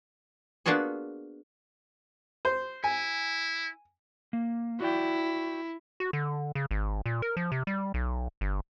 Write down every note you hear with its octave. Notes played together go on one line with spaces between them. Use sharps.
A#3 B3 D4 F4 F#4 G#4
C5
E4 G#5
A#3
E4 F#4 D5 G5
F#4
D3
C#3
G#1
A#2
A#4
F3
C3
G3
B1
G1